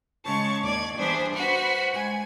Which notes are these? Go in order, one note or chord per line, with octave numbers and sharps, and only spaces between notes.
C#3 G#3 C#5 A5 C#6
D#2 D5 D6 G#6
E3 G3 B3 D4 G#4 C5
F#4 B4 C5 F#5
G#3 G#5